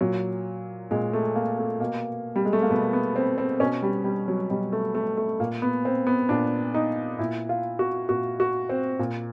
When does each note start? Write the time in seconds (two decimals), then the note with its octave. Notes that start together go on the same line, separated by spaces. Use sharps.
0.01 A#2 F#3
0.91 A#2 G#3
1.13 A3
1.35 A#3
1.58 A3
1.80 B2 A#3
2.36 G3
2.45 G#3
2.53 A3
2.62 A#3
2.70 B2 B3
2.93 B3
3.16 C4
3.38 C4
3.60 B2 C#4
3.82 G3
4.04 G3
4.28 F#3
4.50 B2 G3
4.72 A3
4.95 A3
5.17 A3
5.40 A#2 A#3
5.62 B3
5.85 C4
6.07 B3
6.29 A#2 D4
6.74 D#4
7.19 A#2 E4
7.49 F4
7.79 F#4
8.09 A#2 F#4
8.40 F#4
8.69 C4
8.99 A#2